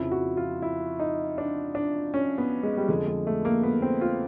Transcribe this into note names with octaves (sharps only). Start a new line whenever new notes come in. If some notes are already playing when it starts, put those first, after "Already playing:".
Already playing: F2 C#3 F3 E4
F#4
F4
E4
D#4
D4
D4
C#4
B3
G#3
G3
F2 D3 F3 G#3
G#3
A3
A#3
B3
C4
F4